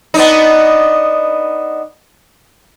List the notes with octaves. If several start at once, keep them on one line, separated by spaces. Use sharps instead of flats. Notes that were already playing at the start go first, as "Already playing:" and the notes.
B3 D4 D#4